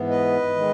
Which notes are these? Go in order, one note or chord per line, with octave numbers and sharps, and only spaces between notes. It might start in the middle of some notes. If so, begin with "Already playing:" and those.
Already playing: G#2 E3 B3
B4 D#5
D#3 G#3